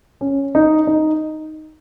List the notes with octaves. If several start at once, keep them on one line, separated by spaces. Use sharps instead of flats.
C#4
D#4
D#4